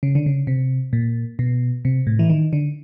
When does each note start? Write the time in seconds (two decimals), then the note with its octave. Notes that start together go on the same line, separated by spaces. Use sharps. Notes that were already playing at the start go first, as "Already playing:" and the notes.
0.03 C#3
0.15 D3
0.26 C#3
0.47 C3
0.93 A#2
1.39 B2
1.85 C3
2.07 A2
2.19 E3
2.29 D#3
2.53 D3